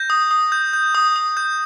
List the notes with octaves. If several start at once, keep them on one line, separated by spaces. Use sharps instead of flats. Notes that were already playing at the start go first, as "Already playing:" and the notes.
Already playing: G6 A#6
D#6
D#6
G6
G6
D#6
D#6
G6